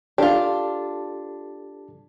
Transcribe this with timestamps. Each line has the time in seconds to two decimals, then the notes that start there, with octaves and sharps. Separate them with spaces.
0.18 D4 F4 G4 A4